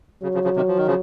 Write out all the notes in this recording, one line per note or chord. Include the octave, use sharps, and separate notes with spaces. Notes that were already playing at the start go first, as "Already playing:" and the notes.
C#3 F#3
C#3 F3
C#3 F3
C3 D#3
F3
D#3
C#3 F3